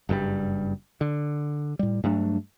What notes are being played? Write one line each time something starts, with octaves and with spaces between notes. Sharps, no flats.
F#1 G2 C3 G3
D3
A2 G3
G2 F#3 A3 D4